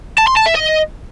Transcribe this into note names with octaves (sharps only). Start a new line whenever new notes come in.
A5
C6
A5
E5
D#5